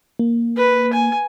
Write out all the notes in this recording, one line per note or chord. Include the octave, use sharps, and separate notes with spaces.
A#3
B4
G#5